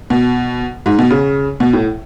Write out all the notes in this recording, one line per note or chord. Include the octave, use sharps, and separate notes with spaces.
B2
G#2
B2
C#3
B2
A2